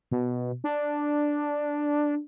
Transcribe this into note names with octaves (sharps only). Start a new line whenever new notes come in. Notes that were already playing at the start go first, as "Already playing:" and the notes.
B2
D4